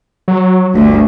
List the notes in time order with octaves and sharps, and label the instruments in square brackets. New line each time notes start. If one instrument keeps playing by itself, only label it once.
[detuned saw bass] F#3
[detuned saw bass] G1 [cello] D2